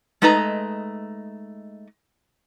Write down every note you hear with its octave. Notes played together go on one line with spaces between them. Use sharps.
G#3 A3 D#4 B4 D#5 A#5